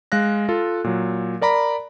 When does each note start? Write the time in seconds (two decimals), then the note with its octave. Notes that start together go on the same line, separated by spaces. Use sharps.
0.12 G#3 F5 F#6 A#6
0.49 F4 A4
0.84 A#2 F#3
1.41 A#4 D5 A#5 B5